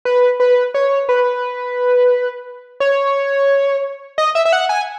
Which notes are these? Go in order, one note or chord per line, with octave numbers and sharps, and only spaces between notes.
B4
B4
C#5
B4
C#5
D#5
E5
E5
F#5
G#5